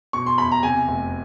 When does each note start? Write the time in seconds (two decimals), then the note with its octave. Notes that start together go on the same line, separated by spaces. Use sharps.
0.13 B2 C#6
0.26 C6
0.38 E2 B5
0.52 A#5
0.63 C3 G#5
0.88 F1